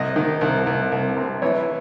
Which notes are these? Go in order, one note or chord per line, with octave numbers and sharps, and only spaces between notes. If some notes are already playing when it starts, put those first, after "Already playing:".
Already playing: C2 D#5
D#3
C2
C2
C2
C3
E3 C#5